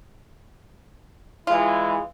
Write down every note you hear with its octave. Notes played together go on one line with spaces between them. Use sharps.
E3 G#3 E4 F4